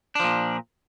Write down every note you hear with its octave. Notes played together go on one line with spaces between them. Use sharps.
A#2 F3 D4